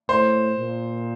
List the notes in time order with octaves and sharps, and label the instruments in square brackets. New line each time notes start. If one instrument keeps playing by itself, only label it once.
[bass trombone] A2 [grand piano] C5
[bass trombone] A#2